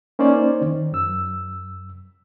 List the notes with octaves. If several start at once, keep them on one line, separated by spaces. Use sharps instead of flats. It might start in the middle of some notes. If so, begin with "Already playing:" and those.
A#3 C#4 D#4 C5 D5
D#3
F#2 E6